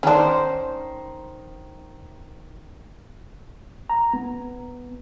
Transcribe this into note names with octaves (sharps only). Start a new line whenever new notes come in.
D#3 C#4 D4 C5
A#5
B3